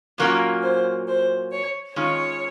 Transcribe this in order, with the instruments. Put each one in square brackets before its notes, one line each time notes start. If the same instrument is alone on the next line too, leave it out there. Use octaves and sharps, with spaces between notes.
[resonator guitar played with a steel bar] A#2 F#3 A#3 C#4 F4 [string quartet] A#4
[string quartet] C5
C5
C#5
[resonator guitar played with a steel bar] D#3 G#3 C#4 F4 [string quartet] C#5